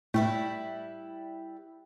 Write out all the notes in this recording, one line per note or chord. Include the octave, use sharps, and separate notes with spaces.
A2 G3 E4 B4